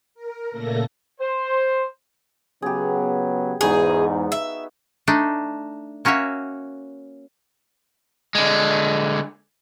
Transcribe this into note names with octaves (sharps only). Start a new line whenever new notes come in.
A#4
A#2 C#3 A3 A#3 A4 A#6
C5
C#3 F#3 B3 G4 G#4
E2 G#2 B3 D#4 F#4 G#4
E5
A3 D4 D#4
A#3 C#4 F#4 C#5 E5
D3 G#3